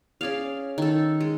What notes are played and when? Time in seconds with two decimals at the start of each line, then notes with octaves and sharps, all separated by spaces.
0.21 C#4 G#4 D5 F5
0.78 D#3 A4
1.20 G#3